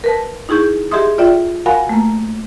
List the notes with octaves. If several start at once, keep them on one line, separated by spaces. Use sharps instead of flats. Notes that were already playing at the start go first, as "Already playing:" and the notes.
A#4 B4 A5
D#4 E4 G#4 C#6 G6
G4 G#4 D#5 E5 C6 D#6
F4 D5 E5 G5
F#4 A#4 F5 F#5 G#5 B5
A3 A#3